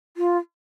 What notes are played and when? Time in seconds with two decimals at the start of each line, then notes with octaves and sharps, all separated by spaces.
0.17 F4